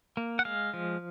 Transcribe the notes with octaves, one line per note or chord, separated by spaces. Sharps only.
A#3
F#5
G#3 F5
F3